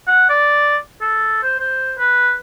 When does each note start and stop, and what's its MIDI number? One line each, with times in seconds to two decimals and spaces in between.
0.07 0.26 78
0.29 0.76 74
1.01 1.41 69
1.43 1.56 72
1.59 1.92 72
1.98 2.36 71